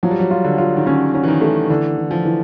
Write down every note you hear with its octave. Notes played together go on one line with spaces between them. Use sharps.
F3 F#3
G3
F#3
F4
D3
F4
D#3
D3 C#4
C#4
E3
D#3
A3
D3 E3
E3
F3
E3